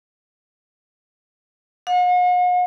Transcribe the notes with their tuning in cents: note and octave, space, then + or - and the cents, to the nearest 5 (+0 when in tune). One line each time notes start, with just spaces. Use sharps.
F#5 -45